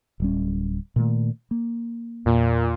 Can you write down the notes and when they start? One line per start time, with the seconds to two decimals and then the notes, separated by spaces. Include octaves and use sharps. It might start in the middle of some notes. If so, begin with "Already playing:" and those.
0.20 D1 G3 C#4
0.96 A#2 D#3 A3
1.51 A#3
2.26 E2 A#2